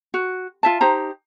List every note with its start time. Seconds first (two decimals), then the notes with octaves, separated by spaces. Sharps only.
0.14 F#4
0.63 F4 E5 A5
0.81 D#4 G4 C5 A#5